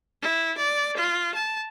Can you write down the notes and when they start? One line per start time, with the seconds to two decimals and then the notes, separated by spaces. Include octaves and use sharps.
0.22 E4
0.57 D5
0.97 F4
1.35 A5